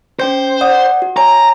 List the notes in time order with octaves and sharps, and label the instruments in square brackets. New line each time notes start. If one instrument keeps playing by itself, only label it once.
[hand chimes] C#4 G5 G6 [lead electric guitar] C5
[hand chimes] D5 F#5 D#6
F#4
[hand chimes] C#5 G#5 A#6 [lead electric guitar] A#5